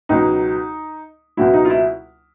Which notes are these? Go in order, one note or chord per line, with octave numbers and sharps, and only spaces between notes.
C#2 B2 F#3 D#4
C#2 B2 F#3 E4
D#4
F4
E4